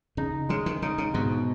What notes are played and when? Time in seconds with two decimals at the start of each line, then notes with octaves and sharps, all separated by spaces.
0.17 C#3 D#4
0.49 C#3 G#3
0.66 D#3
0.82 C#3 D#4
0.98 C#3
1.14 G#2 B2